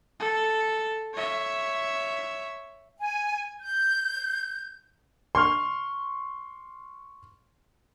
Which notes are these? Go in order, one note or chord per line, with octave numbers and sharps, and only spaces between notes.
A4
C#5 E5
G#5
G6
C6 C#6 F6